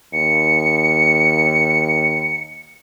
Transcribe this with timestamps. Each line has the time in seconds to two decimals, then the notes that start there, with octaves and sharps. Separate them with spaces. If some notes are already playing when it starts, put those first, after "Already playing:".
0.13 D#2 C#7